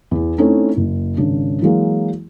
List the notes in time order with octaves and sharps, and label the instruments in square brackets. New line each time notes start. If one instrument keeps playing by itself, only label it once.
[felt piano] E2 E3
A3 C4 C#4 D#4 E4
F#1
G#1 C#3 D4
E3 F#3 G#3 A#3